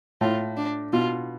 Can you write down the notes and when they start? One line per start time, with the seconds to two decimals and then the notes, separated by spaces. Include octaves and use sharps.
0.21 A2 F4
0.57 D4
0.93 B2 F4